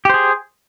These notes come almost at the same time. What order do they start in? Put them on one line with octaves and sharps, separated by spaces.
G4 C5 G#4